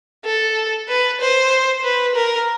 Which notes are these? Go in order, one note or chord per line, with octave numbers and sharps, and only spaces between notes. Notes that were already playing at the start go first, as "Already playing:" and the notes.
A4
B4
C5
B4
A#4